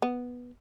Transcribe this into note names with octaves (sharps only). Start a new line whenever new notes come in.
B3